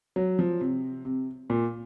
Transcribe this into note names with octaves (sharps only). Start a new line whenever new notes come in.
F#3
F3
C3
C3
A#2